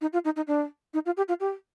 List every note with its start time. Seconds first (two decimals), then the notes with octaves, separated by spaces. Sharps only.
0.01 D#4
0.13 F4
0.25 D#4
0.36 D#4
0.47 D4
0.94 D#4
1.06 F4
1.17 G4
1.28 F4
1.40 G4